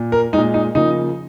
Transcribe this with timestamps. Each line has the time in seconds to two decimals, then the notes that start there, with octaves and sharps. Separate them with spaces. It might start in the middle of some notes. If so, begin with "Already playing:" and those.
Already playing: A#2
0.12 A#4
0.33 A#2 G#3 D#4
0.54 D#4
0.75 C#3 F3 A#3 D#4